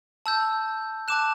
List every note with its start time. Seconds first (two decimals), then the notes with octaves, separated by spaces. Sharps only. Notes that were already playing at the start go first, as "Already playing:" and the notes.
0.26 A5 E6 G6
1.08 A5 D6 F#6 E7